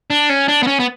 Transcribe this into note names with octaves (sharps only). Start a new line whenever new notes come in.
D4
C#4
D4
B3
C#4
B3